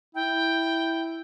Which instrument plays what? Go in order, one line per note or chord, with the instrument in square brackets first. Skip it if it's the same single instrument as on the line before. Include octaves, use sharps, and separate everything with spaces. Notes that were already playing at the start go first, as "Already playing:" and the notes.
[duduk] E4 [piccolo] G5